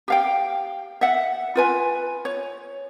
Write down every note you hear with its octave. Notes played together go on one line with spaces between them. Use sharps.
G4 F5 G5
E5 F#5
F4 B4 G#5
C#5